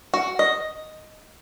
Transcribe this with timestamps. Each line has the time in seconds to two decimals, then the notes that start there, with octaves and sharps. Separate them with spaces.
0.14 F#4
0.39 D#5